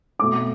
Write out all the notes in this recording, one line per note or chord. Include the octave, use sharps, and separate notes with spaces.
B2 A3 C4 D6